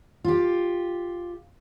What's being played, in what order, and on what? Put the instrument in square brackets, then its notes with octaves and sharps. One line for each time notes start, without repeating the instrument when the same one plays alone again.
[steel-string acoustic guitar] F4 G4